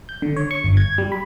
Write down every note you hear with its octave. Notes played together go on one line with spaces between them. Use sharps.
G6
D3
C#5
C#6
G1
G#6
G3
B5